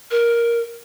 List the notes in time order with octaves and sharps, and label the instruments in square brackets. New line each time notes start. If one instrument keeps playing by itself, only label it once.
[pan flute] A#4